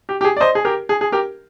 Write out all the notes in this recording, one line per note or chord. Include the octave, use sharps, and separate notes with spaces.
G4
G4
G#4
D5
C5 D#5
G#4
G4 A#4
G#4
G#4
G4 A#4